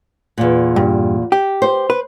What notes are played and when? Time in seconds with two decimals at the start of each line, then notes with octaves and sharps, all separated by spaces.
0.38 E2 A#2
0.76 G2
1.32 G4
1.62 C5
1.90 B4